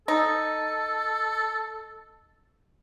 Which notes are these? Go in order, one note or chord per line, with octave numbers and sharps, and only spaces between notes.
D#4 A4